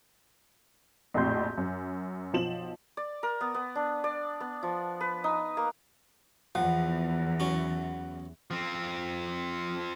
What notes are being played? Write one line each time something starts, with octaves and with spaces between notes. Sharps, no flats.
A#1 F2 A2 F#4 C6 G6
F#2
B1 F3 E7 F#7
D5
A#4
B3
B3
D4
D5
B3
F3
B4
D#4
A#3
E2 F3 F#5
F#3 C#4
F3 C4